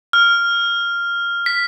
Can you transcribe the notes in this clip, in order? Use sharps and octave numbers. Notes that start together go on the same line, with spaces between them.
F6
B6